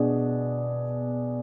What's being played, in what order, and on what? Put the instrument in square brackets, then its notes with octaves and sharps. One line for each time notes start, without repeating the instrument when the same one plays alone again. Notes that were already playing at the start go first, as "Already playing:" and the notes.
Already playing: [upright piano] B2 B3 D4 G#4